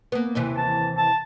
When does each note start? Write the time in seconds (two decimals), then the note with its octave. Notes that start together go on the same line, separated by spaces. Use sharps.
0.12 A#3 B3
0.35 D#2 C3 E3
0.57 A5
0.97 A5